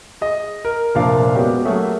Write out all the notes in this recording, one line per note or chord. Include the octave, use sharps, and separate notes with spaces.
G#4 D#5
A#4
F1 A#2 F3 D4 A#4 F5
G#3 B3 C#4 F#4 G4
F#3 A3 A#3 F#4 G#4 E5